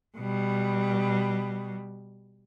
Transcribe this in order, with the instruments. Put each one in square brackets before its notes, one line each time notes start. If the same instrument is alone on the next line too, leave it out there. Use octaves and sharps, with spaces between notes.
[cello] B2 G3